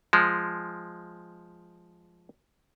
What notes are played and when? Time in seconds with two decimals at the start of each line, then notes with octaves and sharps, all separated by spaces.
0.13 F3 G#3